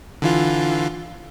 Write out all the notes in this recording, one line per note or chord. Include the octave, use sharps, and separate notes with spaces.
D3 E3 F4